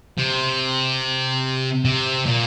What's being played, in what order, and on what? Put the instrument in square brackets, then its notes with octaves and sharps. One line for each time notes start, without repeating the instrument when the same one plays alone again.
[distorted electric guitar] C3
C3
A#2